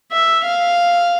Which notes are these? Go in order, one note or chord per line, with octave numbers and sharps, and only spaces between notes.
E5
F5